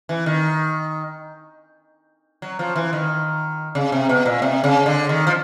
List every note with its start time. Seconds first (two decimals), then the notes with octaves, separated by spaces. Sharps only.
0.09 E3
0.26 D#3
2.42 F#3
2.59 F3
2.76 E3
2.93 D#3
3.75 C#3
3.92 C3
4.09 B2
4.26 A#2
4.42 C3
4.64 C#3
4.86 D3
5.09 D#3
5.27 F3